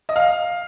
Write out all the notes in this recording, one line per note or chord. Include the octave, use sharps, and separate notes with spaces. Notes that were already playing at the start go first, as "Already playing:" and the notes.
D#5
F5